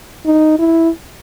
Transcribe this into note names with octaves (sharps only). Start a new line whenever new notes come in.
D#4
E4